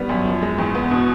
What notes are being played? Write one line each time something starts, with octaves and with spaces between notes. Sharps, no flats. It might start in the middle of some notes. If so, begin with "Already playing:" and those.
Already playing: D#3 G3 B3
F#2
F3
G#3
E2
B3
B2